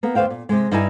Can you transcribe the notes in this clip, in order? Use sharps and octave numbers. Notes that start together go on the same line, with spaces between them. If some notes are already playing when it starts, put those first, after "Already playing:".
A#3 B3
D2 B4 C5 F5 G5
A#2
C3 G#3
G2 G3 D#4 E4 D#5 G#5